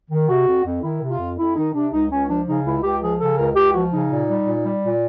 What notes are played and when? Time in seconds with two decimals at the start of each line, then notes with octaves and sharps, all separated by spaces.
0.10 D#3
0.28 C3 F#4
0.47 F2
0.64 F2
0.82 D#3 E4
1.01 C3
1.10 F4
1.19 F2
1.37 F2 E4
1.56 D#3 D#4
1.74 C3 D4
1.92 C#2 D#4
2.10 C#2 C#4
2.28 F3 D4
2.46 C#3 D#4
2.64 C#2 E4
2.83 C#2 G4
3.01 F3 G#4
3.19 C#3 A4
3.37 C#2 A#4
3.55 C#2 G4
3.73 F3 F#4
3.91 C#3 D#4
4.10 A#2
4.28 G3
4.46 A#2
4.64 G3
4.83 A#2